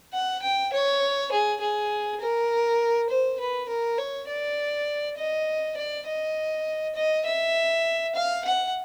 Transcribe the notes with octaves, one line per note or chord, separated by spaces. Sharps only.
F#5
G5
C#5
G#4
G#4
A#4
C5
B4
A#4
C#5
D5
D#5
D5
D#5
D#5
E5
F5
F#5